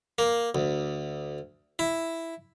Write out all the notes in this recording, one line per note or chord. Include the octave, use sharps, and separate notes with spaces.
A#3
D2
E4